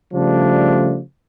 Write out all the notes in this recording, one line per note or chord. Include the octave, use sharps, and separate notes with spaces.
C#3 F3 G3 A3 D4